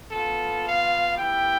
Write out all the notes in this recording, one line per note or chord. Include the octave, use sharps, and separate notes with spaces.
B3 F4 A4
F5
B3 E4 G4 G5